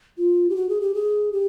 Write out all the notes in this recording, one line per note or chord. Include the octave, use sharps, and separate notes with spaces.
F4
G4
F#4
G#4
G4
G#4
G4